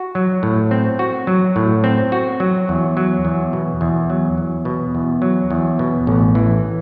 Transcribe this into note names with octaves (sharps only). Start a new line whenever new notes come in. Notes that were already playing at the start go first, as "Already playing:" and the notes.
Already playing: F#4
F#3
A2
C4
F#4
F#3
A2
C4
F#4
F#3
E2
F#3
E2
B2
E2
F#3
E2
B2
E2
F#3
E2
B2
A1
E3